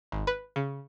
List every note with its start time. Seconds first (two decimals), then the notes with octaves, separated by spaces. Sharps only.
0.12 G#1
0.27 B4
0.56 C#3